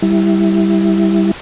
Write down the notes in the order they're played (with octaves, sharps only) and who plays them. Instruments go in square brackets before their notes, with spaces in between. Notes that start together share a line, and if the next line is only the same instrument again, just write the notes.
[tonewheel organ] G3 E4